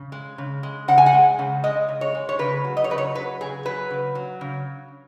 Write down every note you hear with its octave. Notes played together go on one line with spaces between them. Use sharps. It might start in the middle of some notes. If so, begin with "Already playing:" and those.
Already playing: C#3
G#3
C#3
G#3
C#3 F#5
G#5
F#5
G#3
C#3
G#3 D#5
C#3
C#5
G#3
C#5
C#3 B4
F#3
D#5
C#5
C#3 B4
C#5
F#3 B4
C#3 G#4
F#3 B4
C#3
F#3
C#3